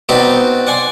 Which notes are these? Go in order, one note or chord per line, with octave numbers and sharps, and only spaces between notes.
B3 C4 D#4 F#4 B4 D5
D5 F#5 G#5 C6